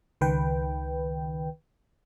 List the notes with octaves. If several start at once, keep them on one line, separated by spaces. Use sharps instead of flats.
C#2 D#3 B4 G5